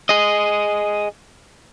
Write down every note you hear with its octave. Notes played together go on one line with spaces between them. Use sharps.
G#4 D#5